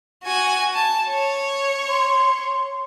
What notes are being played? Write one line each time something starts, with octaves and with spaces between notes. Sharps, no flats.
F#4 G#5
A5
C#5
C6